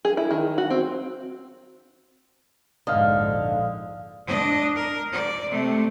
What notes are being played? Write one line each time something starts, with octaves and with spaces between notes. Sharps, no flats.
G#4
E4
D#3
F#4
C4
A#1 F2 G#2 D3 D#5 F5
D4 D#5
A#4
D5
C3 A3